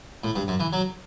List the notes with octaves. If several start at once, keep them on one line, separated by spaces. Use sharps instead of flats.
A2
G2
F#2
E3
F#3